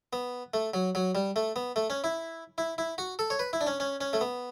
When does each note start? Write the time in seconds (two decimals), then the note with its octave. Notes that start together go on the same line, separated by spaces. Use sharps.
0.13 B3
0.54 A3
0.74 F#3
0.95 F#3
1.15 G3
1.36 A3
1.56 B3
1.76 A3
1.90 C#4
2.04 E4
2.58 E4
2.78 E4
2.98 F#4
3.19 A4
3.30 C#5
3.39 B4
3.53 E4
3.61 D4
3.67 C#4
3.80 C#4
4.01 C#4
4.13 A3
4.21 B3